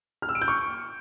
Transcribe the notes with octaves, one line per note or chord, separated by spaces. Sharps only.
F6
E6
D7
G6
C#6